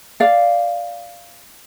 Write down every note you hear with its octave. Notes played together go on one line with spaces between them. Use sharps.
D5 F5